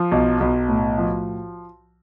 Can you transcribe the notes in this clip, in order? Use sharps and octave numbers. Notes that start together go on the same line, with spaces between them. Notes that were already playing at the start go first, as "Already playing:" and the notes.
Already playing: F3
B1
B1
A2
F3